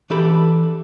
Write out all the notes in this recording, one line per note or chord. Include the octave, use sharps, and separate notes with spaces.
E3 D4 G4 A4 B5